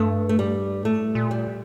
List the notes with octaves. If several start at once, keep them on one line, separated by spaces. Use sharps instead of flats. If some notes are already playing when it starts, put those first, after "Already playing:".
Already playing: G2 A3
A3
G3
A2 A3
A#2
G3